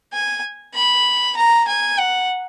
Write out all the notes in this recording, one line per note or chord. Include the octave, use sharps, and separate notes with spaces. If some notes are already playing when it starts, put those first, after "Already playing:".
G#5
B5
A#5
G#5
F#5